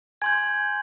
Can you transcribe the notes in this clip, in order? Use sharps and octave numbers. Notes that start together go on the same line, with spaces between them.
G#5 C6 G6 G#6